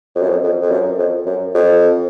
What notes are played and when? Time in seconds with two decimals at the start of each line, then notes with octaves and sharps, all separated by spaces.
0.15 F2
0.22 F#2
0.30 F2
0.43 F2
0.61 F2
0.71 F#2
0.98 F2
1.26 F#2
1.54 F2